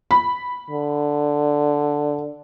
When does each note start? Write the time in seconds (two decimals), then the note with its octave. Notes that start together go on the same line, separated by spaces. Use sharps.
0.11 B5
0.70 D3